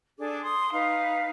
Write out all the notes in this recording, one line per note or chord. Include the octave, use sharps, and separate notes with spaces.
D4 G#4 A4 D6
C6 D#6
D#4 B4 F5